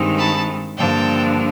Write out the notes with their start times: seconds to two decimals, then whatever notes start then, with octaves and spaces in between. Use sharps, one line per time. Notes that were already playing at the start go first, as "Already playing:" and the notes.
Already playing: G2 D#3 G#3 C4 D#4
0.18 A5 B5
0.78 G2 D3 F3 A#3 D4 G5 A5